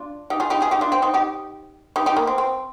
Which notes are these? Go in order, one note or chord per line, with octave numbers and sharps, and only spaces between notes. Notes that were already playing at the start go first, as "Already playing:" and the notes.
Already playing: D4 F4
D#4 G4
F4 G#4
D#4 G4
F4 G#4
D#4 G4
D4 F4
C4
C4 D#4
D#4 G4
D#4 G4
D#4 G4
A#3
C4
C4